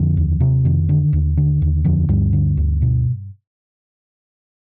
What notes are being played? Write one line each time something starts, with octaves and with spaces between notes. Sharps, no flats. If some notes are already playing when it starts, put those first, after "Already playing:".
Already playing: F2 D3 F3
D#2
C3
F2 D#3
D3
D#2
D3
D#2
F2 D3 F3
D2 G2 G3
D3
D2
B2